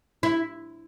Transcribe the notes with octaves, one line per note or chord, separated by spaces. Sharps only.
E4